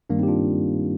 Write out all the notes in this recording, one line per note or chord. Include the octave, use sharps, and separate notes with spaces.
G2 D#3 G3 A#3 D4
C4 D#4
G4
D4 F4